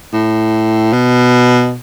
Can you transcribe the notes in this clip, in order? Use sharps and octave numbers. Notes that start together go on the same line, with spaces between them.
A2
B2